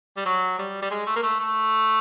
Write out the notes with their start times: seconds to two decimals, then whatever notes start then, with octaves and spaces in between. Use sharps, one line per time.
0.17 G3
0.25 F#3
0.58 G3
0.82 G3
0.91 G#3
1.07 A3
1.16 A#3
1.23 A3
1.39 A3